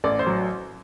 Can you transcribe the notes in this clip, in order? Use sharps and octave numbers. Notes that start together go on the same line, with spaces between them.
A1 D5
C5
F#3